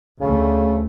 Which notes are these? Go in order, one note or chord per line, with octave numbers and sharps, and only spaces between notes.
D2 C#3 A3